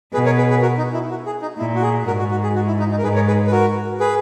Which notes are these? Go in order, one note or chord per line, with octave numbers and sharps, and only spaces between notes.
B2 G#4 B4
A#4 C#5
G#4 B4
G#4 B4
F#4 A#4
D#4
E4
F#4
G#4
D#4
A#2 E4
F#4
G#4
G#2 F#4 A#4
F#4
F#4
G#4
F#4
E4
D#4
D#4
A#4
G#2 G#4 B4
A#4 C#5
G#4 B4
B4
F#4 A#4
G#4 B4